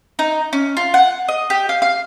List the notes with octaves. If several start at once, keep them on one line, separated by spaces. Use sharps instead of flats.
D#4
C#4
F4
F#5
D#5
G4
F5
F5